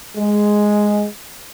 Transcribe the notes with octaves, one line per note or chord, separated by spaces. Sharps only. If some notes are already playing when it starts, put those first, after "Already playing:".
G#3